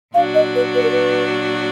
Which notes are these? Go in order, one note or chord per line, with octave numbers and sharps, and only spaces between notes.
A#2 F#3 D4 F#4 F5
D#5
B4
B4
A#4
B4